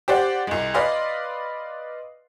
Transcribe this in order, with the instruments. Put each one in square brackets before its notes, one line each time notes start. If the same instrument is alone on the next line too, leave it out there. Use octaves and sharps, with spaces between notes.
[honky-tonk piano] G4 C5 D5 F#5
C2 G#3
B4 D5 D#5 F5 C6